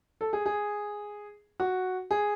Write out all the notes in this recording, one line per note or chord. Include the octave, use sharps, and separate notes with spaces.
A4
G#4
G#4
F#4
G#4